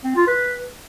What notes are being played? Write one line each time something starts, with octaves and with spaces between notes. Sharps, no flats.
C4
F4
B4